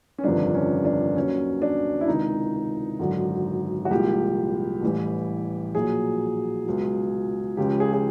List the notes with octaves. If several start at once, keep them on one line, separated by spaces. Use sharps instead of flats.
C#4
G1 F2 C3 D#3 G3 D4
C#4
D4
D#2 D#3 F#3 C#4
D4
E4
C#2 C3 D#3 D#4
G#1 F#2 D3 F#3
F#4
C2 A#2 F3 G#3 G4
A1 A2 E3 G3
A#1 A#2 F#3 G#4
C#2 B2 F#3
C#2 C#3 F3 G4
G#4
G#4